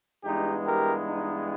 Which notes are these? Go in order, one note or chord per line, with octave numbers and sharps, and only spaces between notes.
G2 E3 G#3 B3 D#4 G4
G4 A#4
D#4